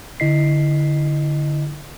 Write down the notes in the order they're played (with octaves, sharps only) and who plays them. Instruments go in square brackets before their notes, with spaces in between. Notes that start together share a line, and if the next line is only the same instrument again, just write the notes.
[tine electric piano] D3 E4 D#5 B6 C7